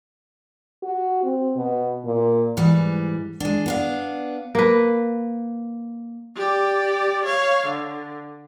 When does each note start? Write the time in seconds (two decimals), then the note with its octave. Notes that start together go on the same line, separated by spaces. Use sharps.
0.83 F#4
1.23 C4
1.56 B2
2.05 A#2
2.57 G#2 E3 G3
3.40 G#3 D4
3.66 B3 D4 F5
4.55 A#3 B4
6.37 G4 D5
7.26 C#5 F5
7.67 D3